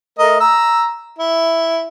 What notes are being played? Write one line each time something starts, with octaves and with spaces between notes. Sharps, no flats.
A3 A#4 D#5
A#5 E6
E4